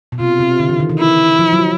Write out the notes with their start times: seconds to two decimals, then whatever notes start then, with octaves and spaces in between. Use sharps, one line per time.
0.12 B2
0.20 C3 F4
0.40 C3
0.60 D3
0.69 E3
0.80 D#3
0.89 E3
0.99 E4
1.39 F3
1.52 F#3